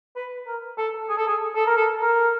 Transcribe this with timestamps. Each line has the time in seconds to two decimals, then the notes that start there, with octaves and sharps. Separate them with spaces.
0.16 B4
0.47 A#4
0.78 A4
1.09 G#4
1.18 A4
1.28 G#4
1.56 A4
1.67 A#4
1.77 A4
2.02 A#4